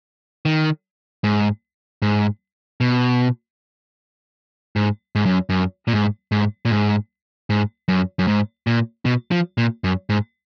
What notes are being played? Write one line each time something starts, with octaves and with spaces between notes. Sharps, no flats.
D#3
G#2
G#2
B2
G#2
G#2
F#2
F#2
A#2
G#2
G#2
A#2
G#2
G#2
F#2
F#2
G#2
A#2
B2
F3
A#2
F#2
G#2